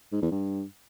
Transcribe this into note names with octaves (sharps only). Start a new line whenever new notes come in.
G#2
E2
G2